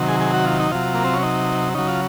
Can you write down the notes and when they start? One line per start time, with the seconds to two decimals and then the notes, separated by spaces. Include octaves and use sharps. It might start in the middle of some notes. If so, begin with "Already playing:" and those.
Already playing: C3 D#3 F#3
0.08 G#4
0.20 G#4
0.34 F#4
0.46 F4
0.60 D#4
0.71 C3 F#3 F4
0.94 A#3
1.04 C4
1.14 C#4
1.23 D#4
1.74 C#3 F#3 D#4
1.88 F4